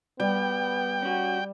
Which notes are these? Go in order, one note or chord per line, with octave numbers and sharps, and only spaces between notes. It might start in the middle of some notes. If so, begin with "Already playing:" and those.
G3 B3 G5
C#4 F#4